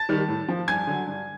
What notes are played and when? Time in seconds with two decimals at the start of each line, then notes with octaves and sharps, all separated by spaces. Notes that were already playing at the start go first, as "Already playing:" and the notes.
Already playing: A5 A6
0.09 D#3 G3
0.28 A2
0.48 F3
0.68 G2 G#5 G#6
0.87 D3 F#3
1.07 G2